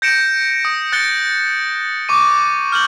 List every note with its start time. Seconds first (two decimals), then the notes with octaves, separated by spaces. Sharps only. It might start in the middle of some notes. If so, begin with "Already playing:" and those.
0.02 G6 A#6 C#7 D7 E7
0.65 D#6
0.92 F#6 A6 C#7 G7
2.09 C#6 D6 D#7
2.72 F6 G6 F#7